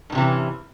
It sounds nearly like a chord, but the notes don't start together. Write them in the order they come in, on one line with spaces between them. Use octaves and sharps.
G2 D#3 C3 E3 C#4